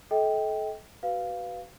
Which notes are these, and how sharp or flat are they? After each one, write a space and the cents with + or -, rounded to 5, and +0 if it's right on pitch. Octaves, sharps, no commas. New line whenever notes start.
A4 -30 D#5 +35 G5 +0
F#4 +35 B4 +0 F5 +0